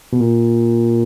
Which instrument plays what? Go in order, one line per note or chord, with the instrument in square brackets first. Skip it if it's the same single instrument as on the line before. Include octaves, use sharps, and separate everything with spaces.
[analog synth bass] B2
A#2